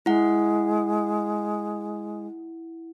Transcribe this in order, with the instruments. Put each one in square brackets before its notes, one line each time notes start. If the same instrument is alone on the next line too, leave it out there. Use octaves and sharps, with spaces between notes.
[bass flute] G#3 [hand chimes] E4 F#5